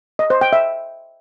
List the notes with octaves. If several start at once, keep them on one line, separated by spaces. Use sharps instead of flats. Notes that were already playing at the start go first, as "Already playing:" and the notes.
D#5
C5
G5
E5